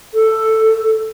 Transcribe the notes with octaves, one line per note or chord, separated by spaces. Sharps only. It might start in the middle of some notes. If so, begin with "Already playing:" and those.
A4